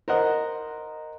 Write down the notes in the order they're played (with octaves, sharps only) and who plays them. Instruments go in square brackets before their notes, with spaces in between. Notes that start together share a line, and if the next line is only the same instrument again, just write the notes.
[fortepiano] A#4 C5 D#5 F#5